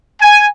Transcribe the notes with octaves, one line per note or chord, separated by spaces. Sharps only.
G#5